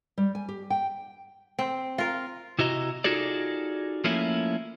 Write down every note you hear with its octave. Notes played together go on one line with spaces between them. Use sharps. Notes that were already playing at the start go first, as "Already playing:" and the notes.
G3
G#5
G4
G5
C4
F4 A#4
C3 E4 F#4 D#5 A#5
D#4 F4 F#4 G#4 A4 D5
F3 A3 A#3 C#4 E4